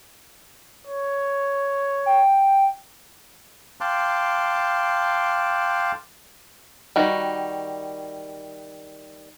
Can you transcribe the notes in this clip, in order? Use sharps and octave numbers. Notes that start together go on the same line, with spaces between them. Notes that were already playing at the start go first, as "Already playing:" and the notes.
C#5
G5
F5 G5 A5 C6 D6 F#6
D#3 G3 F#4